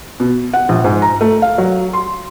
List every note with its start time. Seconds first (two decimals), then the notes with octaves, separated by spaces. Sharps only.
0.20 B2
0.53 F#5
0.69 A#1
0.84 G#2
1.02 A#5
1.21 A3
1.42 F5
1.58 F#3
1.93 C6